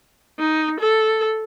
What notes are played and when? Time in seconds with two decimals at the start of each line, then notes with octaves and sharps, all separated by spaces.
0.39 D#4
0.80 A4